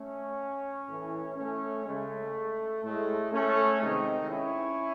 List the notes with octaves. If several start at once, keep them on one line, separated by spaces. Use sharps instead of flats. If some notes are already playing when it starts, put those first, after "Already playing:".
Already playing: A3 C#4
A2 E3 A3
A3 C#4
C#3 G#3 A3
A2 G#3 A3
A3 C#4
C3 D#3 G#3 C4 D#4
C#4 E4